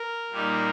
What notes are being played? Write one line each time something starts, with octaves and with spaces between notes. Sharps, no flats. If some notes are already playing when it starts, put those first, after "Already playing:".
Already playing: A#4
A#2 G3 A#3 D#4